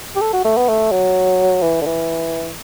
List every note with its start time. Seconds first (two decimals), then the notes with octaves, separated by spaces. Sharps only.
0.16 G4
0.21 A4
0.33 F#4
0.45 A3
0.57 B3
0.69 A3
0.92 F#3
1.62 E3
1.82 D3
1.86 E3